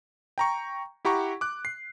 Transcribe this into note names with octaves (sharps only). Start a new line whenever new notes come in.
G5 A#5 C#6
E4 G4 F#5 A#5 C#6
D6 F#6
C7